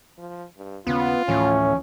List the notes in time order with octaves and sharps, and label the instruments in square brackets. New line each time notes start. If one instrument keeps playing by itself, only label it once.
[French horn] F3
G2
[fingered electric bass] D#2 C#3 C#4 [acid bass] B3 [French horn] F4
[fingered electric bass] D2 E3 F3 [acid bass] A2 [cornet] C#4